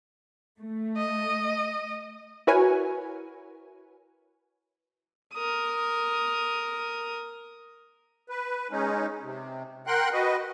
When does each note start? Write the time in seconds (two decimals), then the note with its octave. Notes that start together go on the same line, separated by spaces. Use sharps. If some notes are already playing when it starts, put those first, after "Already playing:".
0.60 A3
0.96 D#5
2.47 E4 F#4 A#4 B4 C#5 G#5
5.33 A#4 D#6
8.29 B4
8.71 G#3 C#4 D#4
9.23 C3
9.87 A#4 F#5 G5 C6 F#6
10.13 F#4 B4 D#5